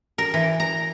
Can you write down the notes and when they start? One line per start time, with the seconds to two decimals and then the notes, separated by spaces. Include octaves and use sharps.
0.18 A#4
0.34 E3
0.60 A#5